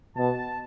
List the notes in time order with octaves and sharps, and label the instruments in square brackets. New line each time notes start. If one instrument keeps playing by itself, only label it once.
[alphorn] B2 [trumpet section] A5